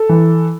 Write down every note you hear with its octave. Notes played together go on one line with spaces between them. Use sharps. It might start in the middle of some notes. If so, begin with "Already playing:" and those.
Already playing: A4
E3